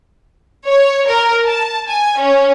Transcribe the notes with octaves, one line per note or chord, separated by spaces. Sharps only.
C#5
A#4
A5
G#5
C#4